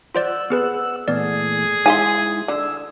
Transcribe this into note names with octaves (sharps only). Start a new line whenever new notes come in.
F4 C5 D5 F#5 E6
B3 G#4 B4
A#2 E3 A3 B3 G#4 D5
G#3 D#4 E4 E5 F5 G#5 C6
D3 E6